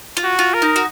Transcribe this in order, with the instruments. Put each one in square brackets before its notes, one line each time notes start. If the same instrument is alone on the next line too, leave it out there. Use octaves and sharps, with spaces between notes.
[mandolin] F4
[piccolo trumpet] F#4
[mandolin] F4
[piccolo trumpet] A#4
[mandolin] D#4
F#4